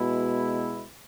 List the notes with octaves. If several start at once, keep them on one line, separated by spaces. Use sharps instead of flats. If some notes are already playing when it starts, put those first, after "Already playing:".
Already playing: B2 G#3 E4